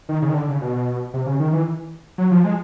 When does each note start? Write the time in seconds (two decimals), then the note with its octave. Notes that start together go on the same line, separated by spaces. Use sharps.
0.09 D#3
0.22 C#3
0.30 D#3
0.35 D3
0.48 C#3
0.61 B2
1.14 C3
1.26 C#3
1.40 D#3
1.53 E3
2.18 F#3
2.31 F3
2.44 G#3